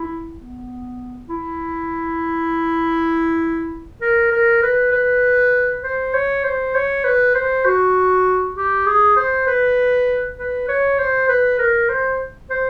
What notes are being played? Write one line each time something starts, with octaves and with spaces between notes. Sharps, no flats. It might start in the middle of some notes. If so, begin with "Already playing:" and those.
Already playing: E4
B3
E4
A#4
A#4
B4
B4
C5
C#5
C5
C#5
B4
C5
F#4
G4
G#4
C5
B4
B4
C#5
C5
B4
A#4
C5
C5